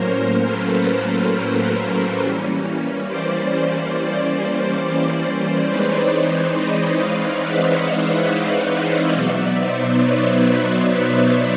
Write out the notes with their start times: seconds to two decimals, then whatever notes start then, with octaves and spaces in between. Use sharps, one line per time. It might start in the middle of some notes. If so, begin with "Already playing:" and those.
Already playing: A2 F#3 A#3 C#4 A#4 C5
0.46 A4 B4
2.20 E3 G3 A#3 C#4
3.07 C5 D5
5.67 E3 G#3 C4 D#4 B4 C#5
6.10 C5 D5
6.54 C#5 D#5
6.97 D#5 F5
7.41 E5 F#5
7.84 D#5 F5
8.28 D#5 F5
8.71 D#5 F5
9.14 B2 F#3 B3 D#4 D5 E5
9.58 C5 D5
10.01 B4 C#5